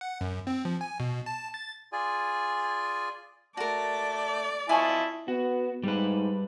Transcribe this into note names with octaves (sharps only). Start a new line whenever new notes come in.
F#5
F#2
C4
F3
G#5
B2
A5
A6
F4 G#4 D5 G#5
A3 F#4 A#4 D5 A5
E4 F4 D#5 G#5 A5 B5 C#6
B3 F#4
G#2 G3 B4